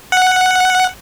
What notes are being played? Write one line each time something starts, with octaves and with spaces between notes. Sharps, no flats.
F#5